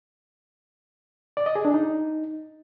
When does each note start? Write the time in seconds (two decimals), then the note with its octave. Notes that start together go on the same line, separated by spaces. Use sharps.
1.37 D5
1.46 D#5
1.55 G#4
1.65 D4
1.74 D#4